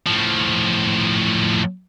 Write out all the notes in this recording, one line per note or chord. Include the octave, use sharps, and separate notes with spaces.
A2 F3